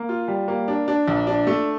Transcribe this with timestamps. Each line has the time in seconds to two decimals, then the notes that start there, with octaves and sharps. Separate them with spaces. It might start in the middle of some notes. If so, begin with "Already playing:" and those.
Already playing: A#3
0.09 F4
0.28 G3
0.48 A#3
0.68 D4
0.88 D4
1.08 A#1
1.27 D4
1.47 A3